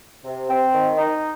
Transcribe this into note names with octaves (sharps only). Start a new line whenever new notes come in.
C3
C4
D#3
D#4